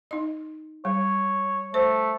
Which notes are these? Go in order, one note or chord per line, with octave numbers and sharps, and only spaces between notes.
D#4 D#5
G3 C#5
A3 C5